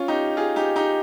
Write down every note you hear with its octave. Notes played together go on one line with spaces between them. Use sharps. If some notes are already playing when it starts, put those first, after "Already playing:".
Already playing: C#4 F4
D#4 G4
F4 G#4
D#4 G4
D#4 G4